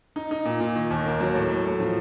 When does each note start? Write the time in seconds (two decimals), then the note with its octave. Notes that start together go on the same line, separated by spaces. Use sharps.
0.16 D#4
0.31 D#4
0.45 A#2
0.60 A#2
0.75 D#3
0.90 D#2
1.06 A#3
1.20 F#3
1.35 A2
1.50 A2
1.65 A2
1.80 F3